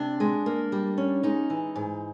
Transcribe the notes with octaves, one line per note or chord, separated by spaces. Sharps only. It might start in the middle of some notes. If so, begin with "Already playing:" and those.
Already playing: C3 D4
G#3
A#3
G3
C#4
G#3 D#4
E3
G#2